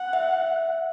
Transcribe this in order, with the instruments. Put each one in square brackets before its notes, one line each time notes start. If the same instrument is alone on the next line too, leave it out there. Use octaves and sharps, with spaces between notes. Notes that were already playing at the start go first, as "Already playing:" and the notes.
Already playing: [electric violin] F#5
[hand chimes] E5